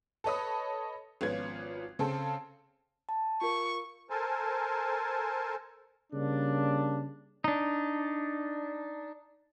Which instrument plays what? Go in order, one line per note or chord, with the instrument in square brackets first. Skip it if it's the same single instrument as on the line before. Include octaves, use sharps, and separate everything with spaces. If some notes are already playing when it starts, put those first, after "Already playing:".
[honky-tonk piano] A4 B4 C#5 D#5 B5 D#6
G#1 F3 B3 C#4 F4 G#6
C#3 C4 G#4 A4
[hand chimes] A5
[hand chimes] F4 A#4 [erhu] C#6
[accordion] A4 A#4 C5 G#5 A5
[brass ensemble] C#3 G3 A#3 D4
[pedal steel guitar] D4 D#4